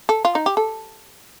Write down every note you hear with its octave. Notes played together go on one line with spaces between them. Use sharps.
A4
F4
D#4
G4
A4